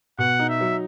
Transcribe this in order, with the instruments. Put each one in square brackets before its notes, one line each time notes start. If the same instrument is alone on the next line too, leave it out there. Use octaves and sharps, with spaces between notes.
[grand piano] B2 [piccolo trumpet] F#5
[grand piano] D#4
[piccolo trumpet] E5
[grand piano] F#3